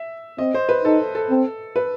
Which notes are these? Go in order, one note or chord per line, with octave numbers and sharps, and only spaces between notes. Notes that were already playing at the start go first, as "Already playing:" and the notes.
Already playing: E5
C4 D#5
C5
B4
D#4 A4
A4
C4
B4